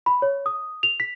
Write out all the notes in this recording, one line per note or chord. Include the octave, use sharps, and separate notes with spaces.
B5
C#5
D#6
F7
B6